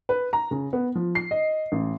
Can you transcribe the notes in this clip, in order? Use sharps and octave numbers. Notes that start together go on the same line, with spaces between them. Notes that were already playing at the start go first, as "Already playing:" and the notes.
B4
A#5
C#3
B3
F3
C7
D#5
A1